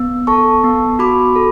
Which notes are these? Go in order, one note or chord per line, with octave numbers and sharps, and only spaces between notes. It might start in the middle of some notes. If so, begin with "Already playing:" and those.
Already playing: B3
A4 A5 C#6
B3
F#4 B5 D6
A4